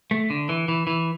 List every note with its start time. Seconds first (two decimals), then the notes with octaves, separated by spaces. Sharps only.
0.11 A3
0.30 D3
0.49 E3
0.68 E3
0.87 E3